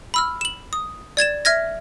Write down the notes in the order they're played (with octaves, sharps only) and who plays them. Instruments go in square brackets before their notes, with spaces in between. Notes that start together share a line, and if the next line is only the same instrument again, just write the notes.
[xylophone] B5 E6 F6
E7 F#7
D#6
D5 G#6 A6 E7
E5 F6 G#6 A#6